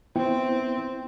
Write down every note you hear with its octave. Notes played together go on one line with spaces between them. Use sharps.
B3 C4 E4 G5